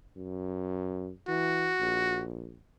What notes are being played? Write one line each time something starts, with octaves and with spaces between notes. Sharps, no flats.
F#2
E3 F#4
A#1